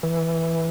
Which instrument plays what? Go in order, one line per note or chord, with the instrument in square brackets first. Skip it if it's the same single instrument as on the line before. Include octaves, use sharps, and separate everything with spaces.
[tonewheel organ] E3